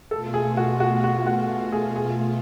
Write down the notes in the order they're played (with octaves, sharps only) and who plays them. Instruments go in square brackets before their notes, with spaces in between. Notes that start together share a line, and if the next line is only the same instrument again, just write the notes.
[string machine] B2 A3 F4 [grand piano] A4
[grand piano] G#4
F#4
F#4
F#4
F#4
G#4
G#4